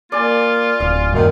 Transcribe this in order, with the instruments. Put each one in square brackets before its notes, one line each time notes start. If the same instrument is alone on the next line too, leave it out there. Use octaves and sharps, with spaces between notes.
[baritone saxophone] A#3 [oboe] F4 [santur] D5 G#5
[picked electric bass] D1 [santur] F5
[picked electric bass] F#2 A#2 [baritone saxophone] D#3